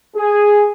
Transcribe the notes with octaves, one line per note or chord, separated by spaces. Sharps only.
G#4